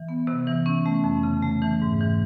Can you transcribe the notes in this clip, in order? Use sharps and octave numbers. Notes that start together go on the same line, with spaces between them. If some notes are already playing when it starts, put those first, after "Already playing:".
Already playing: E3
B3
C3
E3
C#4
A3
F2
C#3
A3
E3
G#2
E3